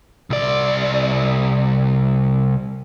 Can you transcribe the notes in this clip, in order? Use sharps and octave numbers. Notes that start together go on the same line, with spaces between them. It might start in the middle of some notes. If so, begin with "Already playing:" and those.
C2 D5